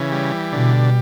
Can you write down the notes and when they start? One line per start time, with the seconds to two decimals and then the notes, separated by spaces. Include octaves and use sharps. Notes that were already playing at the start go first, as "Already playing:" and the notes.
Already playing: C#3 E3
0.12 G3
0.53 B2 D3